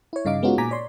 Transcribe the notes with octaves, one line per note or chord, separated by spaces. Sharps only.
E4 C#5
G2 C#3 D#4 F5 D6
G#3 B3 C#4 D#4 F4 F#4
A#2 G#5 A#5 D6 B6
C#5 D5 C6